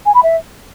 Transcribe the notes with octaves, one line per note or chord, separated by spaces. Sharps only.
G#5
B5
E5